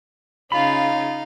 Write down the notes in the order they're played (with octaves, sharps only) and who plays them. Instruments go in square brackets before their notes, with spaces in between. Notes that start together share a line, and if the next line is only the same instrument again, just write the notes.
[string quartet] C#3 C#4 F4 [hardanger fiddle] D#4 F5 [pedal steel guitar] B5